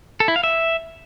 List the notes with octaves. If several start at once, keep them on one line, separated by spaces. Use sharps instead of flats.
A4
E4
F5
E5